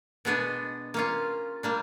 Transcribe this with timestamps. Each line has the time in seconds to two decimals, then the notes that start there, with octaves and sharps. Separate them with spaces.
0.25 B2 G#3 B3 D4
0.94 A#3 C#4 F4
1.63 G3 A#3 D4